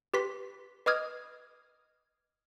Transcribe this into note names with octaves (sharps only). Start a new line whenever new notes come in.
G4 B4 C6 B6
B4 D#5 D6 D#6 F6 G#6